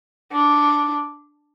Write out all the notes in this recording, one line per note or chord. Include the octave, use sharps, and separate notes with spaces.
D4